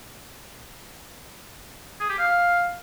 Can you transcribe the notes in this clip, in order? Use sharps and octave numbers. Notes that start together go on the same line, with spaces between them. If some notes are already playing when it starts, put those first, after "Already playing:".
G#4
G4
F5